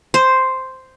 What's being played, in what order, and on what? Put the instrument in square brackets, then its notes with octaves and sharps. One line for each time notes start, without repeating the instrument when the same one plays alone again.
[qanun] C5